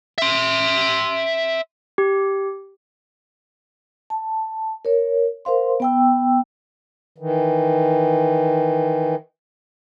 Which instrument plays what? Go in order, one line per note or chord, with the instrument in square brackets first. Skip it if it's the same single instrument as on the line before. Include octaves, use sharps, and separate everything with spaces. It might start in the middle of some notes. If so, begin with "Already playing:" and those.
[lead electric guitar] E5 C6
[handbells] G4
[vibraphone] A5
A#4 C#5
A#4 C5 F5 C6
B3 G5 E6
[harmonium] D#3 E3